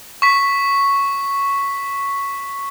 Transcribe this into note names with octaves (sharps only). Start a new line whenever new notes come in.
C#6 B6